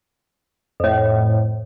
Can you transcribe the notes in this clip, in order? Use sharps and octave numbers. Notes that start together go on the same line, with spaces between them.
F2 A2